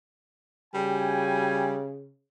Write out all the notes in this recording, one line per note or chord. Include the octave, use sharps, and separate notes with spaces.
C#3 G3 F#4 G5 G#5